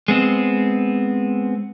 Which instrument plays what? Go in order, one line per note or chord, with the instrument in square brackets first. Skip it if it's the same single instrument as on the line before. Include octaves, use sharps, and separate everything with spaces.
[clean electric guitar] G#3 B3 C4